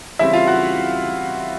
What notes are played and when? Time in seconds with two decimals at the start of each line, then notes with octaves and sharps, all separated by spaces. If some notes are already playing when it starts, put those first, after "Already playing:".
0.19 C#3 E3 G3 C4 E4 E5
0.33 F4 F5
0.48 F#4 F#5